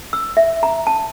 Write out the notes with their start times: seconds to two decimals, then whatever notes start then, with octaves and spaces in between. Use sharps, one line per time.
0.13 E6
0.37 E5
0.63 A#5
0.87 A5